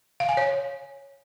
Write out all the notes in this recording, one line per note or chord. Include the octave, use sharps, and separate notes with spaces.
F5
G#5
C#5